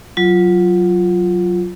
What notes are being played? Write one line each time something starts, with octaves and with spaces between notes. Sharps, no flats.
F#3 F4